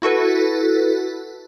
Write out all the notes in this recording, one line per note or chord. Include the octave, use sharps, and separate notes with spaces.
E4 F#4 A4 B4